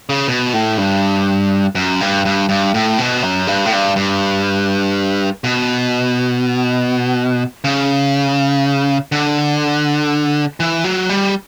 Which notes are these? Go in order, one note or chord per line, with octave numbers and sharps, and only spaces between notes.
C#3
B2
A2
G2
F#2
G2
G2
G2
A2
B2
F#2
G2
A2
G2
G2
B2
C#3
D3
E3
F#3
G3